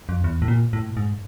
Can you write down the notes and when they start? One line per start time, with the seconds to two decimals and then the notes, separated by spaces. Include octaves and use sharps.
0.09 F2
0.24 E2
0.42 A2
0.48 A#2
0.73 A2
0.97 G#2